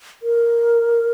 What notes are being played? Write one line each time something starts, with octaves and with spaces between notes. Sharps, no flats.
A#4